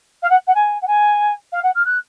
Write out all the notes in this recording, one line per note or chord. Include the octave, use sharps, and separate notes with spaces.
F5
F#5
F#5
G#5
F#5
G#5
F5
F#5
F6
F#6